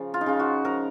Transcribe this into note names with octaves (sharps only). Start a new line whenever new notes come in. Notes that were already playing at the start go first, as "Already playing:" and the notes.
Already playing: C#3 F3
F4
D#4
C#3 F4
F#4
F3 A#4